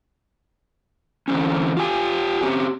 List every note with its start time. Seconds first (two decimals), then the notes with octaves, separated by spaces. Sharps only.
1.28 D3 E3 C4 C#4
1.77 F4 G4 G#5
2.41 C4 C#4 G4